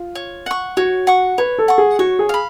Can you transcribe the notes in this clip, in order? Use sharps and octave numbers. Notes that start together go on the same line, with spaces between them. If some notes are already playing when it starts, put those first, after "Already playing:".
Already playing: F4
C#5
F#5 C#6
F#4 C#5
F#5 C#6
B4 C#5
A4
F#5 C#6
G#4
F#4 C#5
G#4
F5 B5